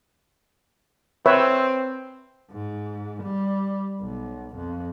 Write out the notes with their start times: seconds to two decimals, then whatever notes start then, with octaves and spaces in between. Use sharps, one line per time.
1.26 C4 B4 C#5 E5
2.51 G#2
3.23 G3
4.01 B1
4.56 F2